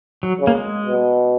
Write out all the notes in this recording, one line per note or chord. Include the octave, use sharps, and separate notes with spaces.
F#3
C#3
A#3
G#3
B2